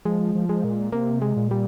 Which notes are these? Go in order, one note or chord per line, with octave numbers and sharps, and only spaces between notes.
F3 G#3
F3
G#3
A#2
C3 A#3
G#3
A#2
G3